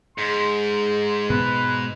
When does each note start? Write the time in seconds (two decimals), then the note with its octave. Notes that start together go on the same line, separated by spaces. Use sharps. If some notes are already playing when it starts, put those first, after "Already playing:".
0.18 G#2 G#3 C6
1.30 B2 B3 B4